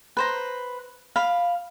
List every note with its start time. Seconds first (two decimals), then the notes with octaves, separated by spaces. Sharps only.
0.17 B4 C5 A#5
1.16 F5 B5